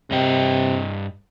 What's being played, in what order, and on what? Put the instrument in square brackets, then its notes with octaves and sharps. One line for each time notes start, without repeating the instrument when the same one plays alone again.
[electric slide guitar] G2 D#5 G5 [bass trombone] C3